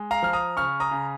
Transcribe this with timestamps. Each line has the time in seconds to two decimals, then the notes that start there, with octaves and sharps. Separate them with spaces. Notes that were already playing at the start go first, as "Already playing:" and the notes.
Already playing: G#3
0.11 F5 A#5
0.23 F3 F6
0.33 A#5 D#6
0.57 C#3 C#6 F6
0.80 A#5 D#6
0.91 C#3